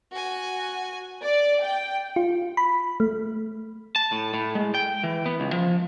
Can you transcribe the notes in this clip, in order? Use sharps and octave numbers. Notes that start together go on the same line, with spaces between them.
F#4 G#5
D5
G5
F4
B5
A3
A5
A2
A2
G#3
G5
E3
B3
C#2
F3